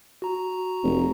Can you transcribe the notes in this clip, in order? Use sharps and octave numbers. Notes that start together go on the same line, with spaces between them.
F#4 A#5
F1